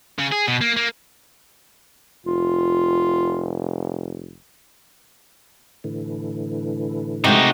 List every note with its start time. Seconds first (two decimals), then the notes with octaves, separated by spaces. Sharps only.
0.19 C#3
0.32 G#4
0.47 B2
0.61 A#3
0.77 A#3
2.26 F1 F4
5.84 A2 D3 E3
7.24 C3 G#3 A3 D#4 F#4